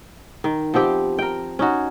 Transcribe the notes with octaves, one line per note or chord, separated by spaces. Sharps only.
D#3
F3 B3 C4 G4
A#4 G5
C#4 D#4 F#4